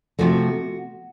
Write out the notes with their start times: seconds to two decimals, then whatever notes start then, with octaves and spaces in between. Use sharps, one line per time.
0.19 C3 F3 A3 F#4